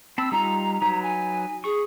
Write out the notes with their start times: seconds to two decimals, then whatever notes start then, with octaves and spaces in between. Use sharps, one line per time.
0.18 C4 A5 B5 E6
0.32 G3 D#4 F4 A#5
0.82 F#3 D#4 B4
1.02 G#5
1.64 G#4 C#6